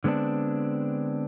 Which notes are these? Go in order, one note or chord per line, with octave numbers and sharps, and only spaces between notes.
D3 G#3 B3 C4 D4